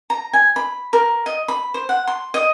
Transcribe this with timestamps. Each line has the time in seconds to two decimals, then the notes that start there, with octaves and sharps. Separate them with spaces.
0.10 A#5
0.33 G#5
0.56 B5
0.93 A#4
1.26 D#5
1.48 B5
1.74 C5
1.89 F#5
2.07 C6
2.34 D#5